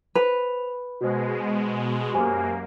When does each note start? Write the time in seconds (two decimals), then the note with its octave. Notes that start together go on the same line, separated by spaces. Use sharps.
0.15 B4 C5 F7
1.01 B2 G#3 F#4 C5
2.14 F#2 A#3 G4 C5 G#5